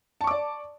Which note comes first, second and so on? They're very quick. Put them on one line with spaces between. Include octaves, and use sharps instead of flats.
A5 C#6 D6 D5